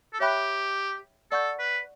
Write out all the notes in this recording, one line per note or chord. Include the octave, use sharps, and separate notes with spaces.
A4
G4 C#5 E5 G5 B5 F#6
A4 D5 F#5 C#6 G6
B4